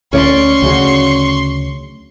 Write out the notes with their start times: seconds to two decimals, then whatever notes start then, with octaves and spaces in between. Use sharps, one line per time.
0.13 D2 C#4 D5 C6 C#6
0.62 D2 C#3 F#3